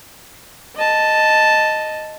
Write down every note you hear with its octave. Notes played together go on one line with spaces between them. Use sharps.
D#5 A5